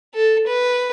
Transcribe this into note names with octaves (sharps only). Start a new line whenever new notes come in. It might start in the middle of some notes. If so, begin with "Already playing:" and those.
A4
B4